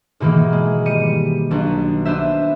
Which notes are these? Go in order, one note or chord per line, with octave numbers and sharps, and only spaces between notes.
G#2 B2 D#3 E3 A#3
G#3
G3 C#7 D#7
B1 D4
B3 D4 C5 E5